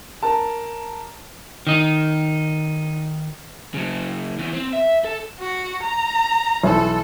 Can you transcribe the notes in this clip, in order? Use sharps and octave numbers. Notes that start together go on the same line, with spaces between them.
A#4 A5
D#3 D#4
C#3 F#3
E2 E3
C4
E5
A4
F#4
A#5
B1 E3 A4